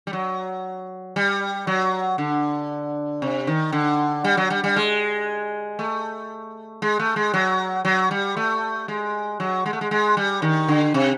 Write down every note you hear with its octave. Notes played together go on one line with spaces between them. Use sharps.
G3
F#3
G3
F#3
D3
C3
D#3
D3
G3
F#3
G3
G3
G#3
A3
G#3
A3
G#3
F#3
F#3
G3
A3
G#3
F#3
G#3
A3
G#3
G#3
G3
D#3
D3
C3